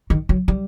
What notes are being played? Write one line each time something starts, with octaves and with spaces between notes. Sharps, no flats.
D#3
F#3
G3